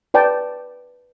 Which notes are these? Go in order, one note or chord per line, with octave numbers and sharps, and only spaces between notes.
B4 D5 G5 A5